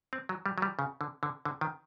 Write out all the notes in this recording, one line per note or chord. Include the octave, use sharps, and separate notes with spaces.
C4
F#3
G3
F#3
G3
C#3
D3
D3
D3
D#3